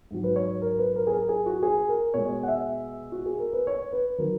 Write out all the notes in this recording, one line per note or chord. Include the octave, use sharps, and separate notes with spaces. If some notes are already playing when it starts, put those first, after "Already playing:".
G#2 F#3
B4
C#5
A#4
B4
A#4
G#4
A#4
G#4
F#4
G#4
A#4
B2 G#3 C#5
F#5
E5
F#4
G#4
A#4
B4
C#5
B4
D#3 F#3 A#4